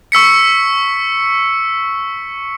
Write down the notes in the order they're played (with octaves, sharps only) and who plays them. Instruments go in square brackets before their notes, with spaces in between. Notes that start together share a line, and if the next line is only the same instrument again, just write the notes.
[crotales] C#6 E6 B6 C#7